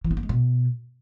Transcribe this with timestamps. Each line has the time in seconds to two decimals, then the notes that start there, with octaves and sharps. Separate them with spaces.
0.04 E3
0.11 B3
0.17 A#3
0.23 G#3
0.29 B2